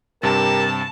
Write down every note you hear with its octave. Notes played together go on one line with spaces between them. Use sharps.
G2 C3 G4 A#4 A5